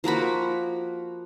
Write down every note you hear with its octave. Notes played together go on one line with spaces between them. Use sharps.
F3 A#3 F#4 B5